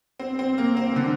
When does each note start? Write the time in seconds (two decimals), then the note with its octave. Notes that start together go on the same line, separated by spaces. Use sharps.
0.20 C4
0.39 C4
0.58 A#3
0.77 C4
0.96 D3